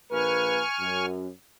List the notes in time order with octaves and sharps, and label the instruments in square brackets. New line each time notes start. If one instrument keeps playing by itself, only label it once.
[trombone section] A#1 A#3 B4 [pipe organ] G#5 C#6 F6
[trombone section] F#2